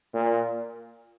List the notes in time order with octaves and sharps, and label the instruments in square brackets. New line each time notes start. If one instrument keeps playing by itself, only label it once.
[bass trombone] A#2